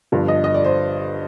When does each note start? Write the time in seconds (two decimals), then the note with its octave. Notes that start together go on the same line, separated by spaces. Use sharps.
0.12 G1 G2 F3
0.28 D#5
0.44 D#5
0.54 D5
0.64 C5